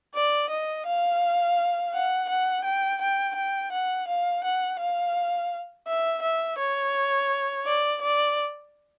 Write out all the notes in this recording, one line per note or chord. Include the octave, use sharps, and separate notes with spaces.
D5
D#5
F5
F#5
F#5
G5
G5
G5
F#5
F5
F#5
F5
E5
E5
C#5
D5
D5